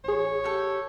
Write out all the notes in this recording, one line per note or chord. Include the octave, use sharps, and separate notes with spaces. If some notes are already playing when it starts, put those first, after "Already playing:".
A1 G#4 C#5
G4 A4